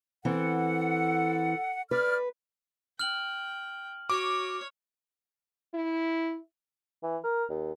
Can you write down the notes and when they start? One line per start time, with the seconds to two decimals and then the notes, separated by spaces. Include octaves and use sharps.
0.25 E3 C4 A4 F#5
1.91 B4 D5 F6
2.99 G5 F6 F#7
4.10 F#4 C#5 D6
5.74 E4
7.03 E3
7.24 A#4
7.50 D#2